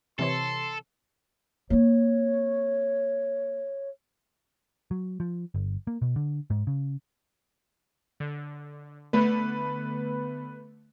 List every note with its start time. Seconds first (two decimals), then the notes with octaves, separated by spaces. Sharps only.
0.19 C3 E3 A4 C#5 C6
1.70 A#3 C4 C#5
4.91 F#3
5.20 F3
5.54 G1
5.87 A#3
6.02 B2
6.16 D3
6.50 G#2
6.67 C#3
8.20 D3
9.13 D3 A3 B3 B4